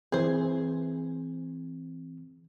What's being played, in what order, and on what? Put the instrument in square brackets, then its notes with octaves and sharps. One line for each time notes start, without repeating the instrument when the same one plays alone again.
[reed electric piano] E3 C4 [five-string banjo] G#4 C5